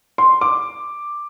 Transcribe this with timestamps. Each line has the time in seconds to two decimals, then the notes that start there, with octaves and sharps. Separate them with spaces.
0.18 C6
0.41 D6